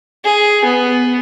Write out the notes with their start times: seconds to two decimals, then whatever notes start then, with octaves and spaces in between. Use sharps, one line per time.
0.25 G#4
0.65 B3